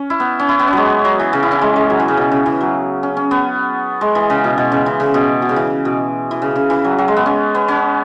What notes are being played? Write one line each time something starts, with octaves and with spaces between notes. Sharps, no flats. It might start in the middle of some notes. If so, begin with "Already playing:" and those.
Already playing: C#4
E4
B3
C#4
E4
B3
C#4
F#3 G#3
F#3
E3
C#3
E4
C#4
G#3
G#3
F#3
E3
C#3
B2
C#3
E3
F#3
C#4
C#4
B3
G#3
E3
C#3
B2
B2
C#3
E3
C#3
B2
B2
C#3
E3
B2
E3
C#3
C#3
E3
F#3
F#3
G#3
B3
C#4
B3
C#4